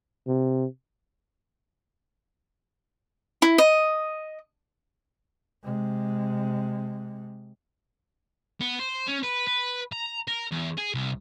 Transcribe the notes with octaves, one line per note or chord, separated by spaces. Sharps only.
C3
E4
D#5
C3 G#3
B3
C5
C#4
B4
B4
A#5
A#4
E2
G#4
C2